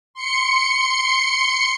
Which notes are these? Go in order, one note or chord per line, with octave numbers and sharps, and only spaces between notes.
C6 C#7